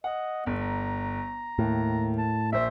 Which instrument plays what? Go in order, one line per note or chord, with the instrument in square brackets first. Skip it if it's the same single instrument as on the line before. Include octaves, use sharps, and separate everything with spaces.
[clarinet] D#5 [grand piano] F#5
[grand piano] G1 [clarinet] B3
[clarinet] A#5
[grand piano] D#2 [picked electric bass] A2
[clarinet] A5
[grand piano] A#1 C5 [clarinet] E5